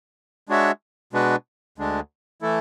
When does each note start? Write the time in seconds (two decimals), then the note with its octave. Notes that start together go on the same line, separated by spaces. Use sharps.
0.49 G#3 D4 F#4 C#5 E5
1.13 B2 G#3 D4 F#4 B4
1.78 D2 D3 G#3 D4
2.42 E3 A3 E4 A4